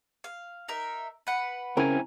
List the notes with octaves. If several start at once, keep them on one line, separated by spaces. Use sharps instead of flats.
F5
D#4 A#4 E5
B4 F#5
C#2 C#3 C4 E4 A#4 G#5